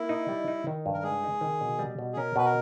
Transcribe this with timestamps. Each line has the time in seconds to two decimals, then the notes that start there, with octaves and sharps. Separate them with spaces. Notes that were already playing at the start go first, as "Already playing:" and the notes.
Already playing: A#3 E4
0.09 D#4
0.29 G3
0.48 D#4
0.67 D#3
0.86 G2
0.94 A#4
1.04 G#3 G#4
1.24 D#4
1.41 D#3
1.61 B2
1.79 G3
1.99 B2
2.13 G#4
2.17 C#4 A#4
2.36 B2 B4
2.45 A#4